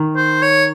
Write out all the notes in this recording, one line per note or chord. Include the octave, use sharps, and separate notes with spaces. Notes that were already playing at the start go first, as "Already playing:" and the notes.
Already playing: D#3
C5
C#5